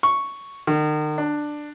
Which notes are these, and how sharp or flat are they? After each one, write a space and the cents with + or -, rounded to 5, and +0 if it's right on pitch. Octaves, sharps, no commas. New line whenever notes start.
C#6 +0
D#3 -40
D4 +10